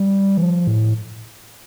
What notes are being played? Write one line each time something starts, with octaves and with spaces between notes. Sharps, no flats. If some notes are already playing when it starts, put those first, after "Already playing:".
Already playing: G3
E3
F3
A2